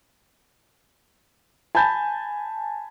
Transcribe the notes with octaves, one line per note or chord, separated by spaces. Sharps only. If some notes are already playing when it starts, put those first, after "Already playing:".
G#5 A5 B5 G6 A6